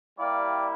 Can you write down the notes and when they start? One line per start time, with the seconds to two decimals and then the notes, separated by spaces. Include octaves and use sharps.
0.18 G3 A#3 E4 G4 D5 F5